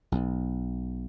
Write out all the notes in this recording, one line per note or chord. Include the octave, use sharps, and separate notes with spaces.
B1